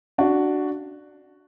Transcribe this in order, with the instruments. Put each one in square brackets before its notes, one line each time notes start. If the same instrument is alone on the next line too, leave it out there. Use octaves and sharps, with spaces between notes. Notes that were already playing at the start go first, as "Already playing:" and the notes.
[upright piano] D4 F#4